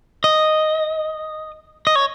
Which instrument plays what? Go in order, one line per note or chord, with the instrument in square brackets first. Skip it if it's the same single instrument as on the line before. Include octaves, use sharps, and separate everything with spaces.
[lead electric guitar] D#5
D#5
C#5